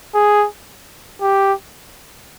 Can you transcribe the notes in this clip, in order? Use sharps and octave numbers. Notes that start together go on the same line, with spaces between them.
G#4
G4